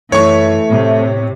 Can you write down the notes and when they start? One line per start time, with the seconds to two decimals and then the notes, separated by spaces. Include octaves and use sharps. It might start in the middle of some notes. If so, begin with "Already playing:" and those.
0.12 F#2 E3 A3 C#5 C#6
0.70 A2 C3